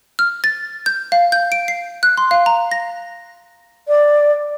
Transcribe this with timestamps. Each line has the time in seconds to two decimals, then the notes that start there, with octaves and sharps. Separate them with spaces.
0.19 F6
0.44 A6
0.86 G6
1.12 F5
1.32 G6
1.52 D7
1.68 C7
2.03 F#6
2.17 C6
2.31 F5
2.46 A#5
2.71 A#6
3.88 D5